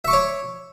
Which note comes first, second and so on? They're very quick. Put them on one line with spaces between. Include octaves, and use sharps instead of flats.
E5 C#6 D6 C#5